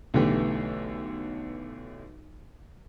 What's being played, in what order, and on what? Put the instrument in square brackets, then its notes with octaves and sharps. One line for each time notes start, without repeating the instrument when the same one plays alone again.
[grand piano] B1 D3 E3 A3 G4